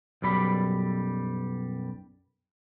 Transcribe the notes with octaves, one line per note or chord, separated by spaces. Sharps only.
B1 F#2 G3 D5 B5